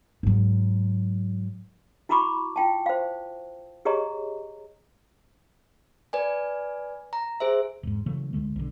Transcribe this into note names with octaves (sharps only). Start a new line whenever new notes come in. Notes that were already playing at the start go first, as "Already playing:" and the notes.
G#2 F#3
E4 F#4 A#5 B5 C#6 D6
F4 G5 A5
C5 F5
G4 G#4 C#5 D#5 A#5
B4 D5 G#5
A#5
G#4 C5 E5
E1 G#2
C#3 E3 F#3 A3
C#2 D3 G#3 A3
B1 D3